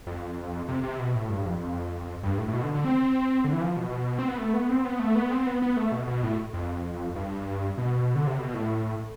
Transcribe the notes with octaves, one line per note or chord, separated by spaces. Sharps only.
F2
C3
C3
B2
A2
G2
F2
G2
A2
A2
B2
D3
D3
C4
D3
E3
F3
B2
C4
B3
A3
B3
C4
B3
A3
B3
C4
B3
B3
A3
B2
B2
A2
F2
G2
B2
D3
C3
B2
A2